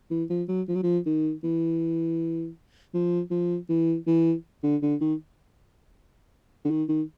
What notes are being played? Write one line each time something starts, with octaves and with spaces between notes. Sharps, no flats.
E3
F3
F#3
F3
F#3
F3
D#3
E3
F3
F3
E3
E3
D3
D3
D#3
D3
D#3
D#3